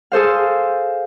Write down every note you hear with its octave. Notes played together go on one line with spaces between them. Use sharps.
G#4 A4 C5 F5